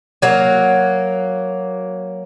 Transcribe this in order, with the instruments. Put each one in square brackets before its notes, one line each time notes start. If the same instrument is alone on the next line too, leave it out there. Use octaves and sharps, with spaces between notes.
[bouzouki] F#3 A#3